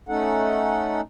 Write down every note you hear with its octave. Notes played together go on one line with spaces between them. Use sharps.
A3 C#4 D#4 A4 F#5